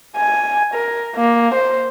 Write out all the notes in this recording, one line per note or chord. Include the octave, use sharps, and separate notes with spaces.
G#5
A#4
A#3
C5